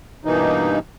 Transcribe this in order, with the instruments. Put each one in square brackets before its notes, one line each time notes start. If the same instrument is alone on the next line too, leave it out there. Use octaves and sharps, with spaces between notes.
[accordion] G2 B2 E3 A#3 D#4